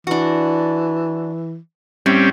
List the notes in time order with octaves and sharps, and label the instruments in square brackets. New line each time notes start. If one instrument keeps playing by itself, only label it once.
[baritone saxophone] E3 [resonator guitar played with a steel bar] D4 F#4
[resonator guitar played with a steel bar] A2 [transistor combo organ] G3 C4 C#4